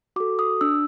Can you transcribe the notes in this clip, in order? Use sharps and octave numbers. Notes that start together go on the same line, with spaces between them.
F#4 A4 D6
D#6
D4 E6